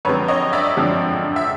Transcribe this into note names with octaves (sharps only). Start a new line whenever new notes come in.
F#2 D3 F3 G#3 C4 B4 C#5
C#5 D#5
D5 E5
F#2 D3 F3 G#3 C4
E5